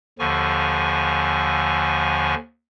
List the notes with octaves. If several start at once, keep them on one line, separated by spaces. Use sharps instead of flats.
D#2 D3 F3 G#5 C#6